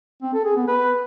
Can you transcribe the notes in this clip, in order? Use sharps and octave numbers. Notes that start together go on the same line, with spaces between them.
C4
A4
G#4
B3
B4